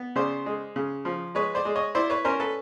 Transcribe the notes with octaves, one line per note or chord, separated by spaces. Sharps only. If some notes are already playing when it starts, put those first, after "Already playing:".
Already playing: B3
C#3 C5 D5
G#3
C#3
F3
G#3 B4 C#5
C5 D5
G#3
C#5 D#5
E4 C5 D5
B4 C#5
C#4 A#4 C5
A4 B4